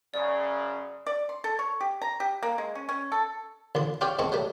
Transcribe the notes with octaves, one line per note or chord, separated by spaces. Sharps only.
F#2 C#3 D5
D5
C6
A4
C#5
G4
A#5
G4
A#3
G#3
C#4
C#4
A4
A1 D2 C6
F4 G4 C#5 D5 F5
G#2 G#3 C4 A5 C#6
F#3 G3 A3